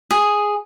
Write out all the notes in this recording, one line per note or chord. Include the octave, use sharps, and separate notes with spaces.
G#4